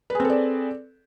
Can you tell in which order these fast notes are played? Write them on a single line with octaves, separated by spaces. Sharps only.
B4 G#4 C4 A4 D5